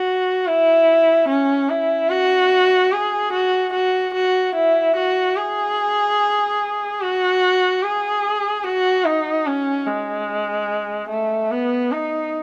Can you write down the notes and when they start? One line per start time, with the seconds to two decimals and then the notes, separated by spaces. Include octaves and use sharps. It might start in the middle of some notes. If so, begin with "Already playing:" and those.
Already playing: F#4
0.47 E4
1.28 C#4
1.69 E4
2.09 F#4
2.92 G#4
3.33 F#4
3.73 F#4
4.14 F#4
4.55 E4
4.96 F#4
5.37 G#4
7.01 F#4
7.82 G#4
8.64 F#4
9.05 D#4
9.46 C#4
9.87 G#3
11.09 A3
11.51 B3
11.91 D#4